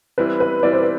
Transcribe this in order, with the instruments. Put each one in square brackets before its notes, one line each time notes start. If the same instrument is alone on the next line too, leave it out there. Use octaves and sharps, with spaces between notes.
[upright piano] E3 G3 C4 E4 [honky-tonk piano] B4
[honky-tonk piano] B4
[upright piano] E3 G3 C4 E4 [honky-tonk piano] D5
[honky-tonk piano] C5
B4